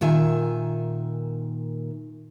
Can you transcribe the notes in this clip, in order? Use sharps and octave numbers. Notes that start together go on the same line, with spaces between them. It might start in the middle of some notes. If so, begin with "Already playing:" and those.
A#2 D#3 E5 G#5